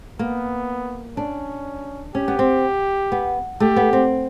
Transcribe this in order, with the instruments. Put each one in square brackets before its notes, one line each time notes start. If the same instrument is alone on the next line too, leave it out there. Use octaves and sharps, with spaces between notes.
[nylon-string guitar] A#3 [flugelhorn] B3
[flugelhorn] C#4 [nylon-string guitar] D4
[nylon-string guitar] C#4 [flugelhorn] G4
[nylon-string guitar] B3
C4
B3
[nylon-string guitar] A3 [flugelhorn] G4
[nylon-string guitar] B3
C4